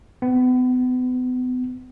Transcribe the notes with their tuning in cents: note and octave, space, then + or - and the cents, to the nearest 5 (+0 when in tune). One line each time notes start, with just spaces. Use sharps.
B3 +35